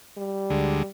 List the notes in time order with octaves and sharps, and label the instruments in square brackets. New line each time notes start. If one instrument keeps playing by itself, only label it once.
[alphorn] G3
[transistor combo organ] D2 D3 G#3